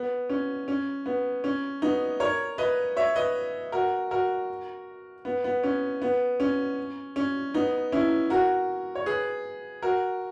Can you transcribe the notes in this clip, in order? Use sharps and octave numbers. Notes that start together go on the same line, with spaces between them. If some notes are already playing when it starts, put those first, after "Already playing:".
Already playing: B3
C#4
C#4
B3
C#4
B3 D#4
A#4 C#5
B4 D#5
C#5 E5
B4 D#5
F#4 A#4
F#4 A#4
B3
B3
C#4
B3
C#4
C#4
B3 D#4
C#4 E4
F#4 A#4
C#5
G#4 B4
F#4 A#4